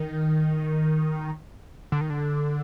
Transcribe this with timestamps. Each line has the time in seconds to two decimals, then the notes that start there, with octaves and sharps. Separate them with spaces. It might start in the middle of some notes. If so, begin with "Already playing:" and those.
Already playing: D#3
1.92 D3
2.01 D#3
2.10 D3